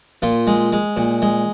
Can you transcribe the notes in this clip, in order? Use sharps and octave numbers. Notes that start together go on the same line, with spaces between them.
A#2 F4
G#3
G#3
A#2
G#3